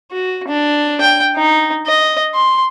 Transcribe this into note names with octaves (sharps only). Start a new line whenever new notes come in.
F#4
D4
G5
D#4
D#5
C6